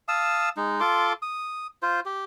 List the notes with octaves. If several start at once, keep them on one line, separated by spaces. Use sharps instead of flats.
F5 A5 D#6 E6
G#3 D#4
F4 A4 C6 D6
D#6
F4 C5
G4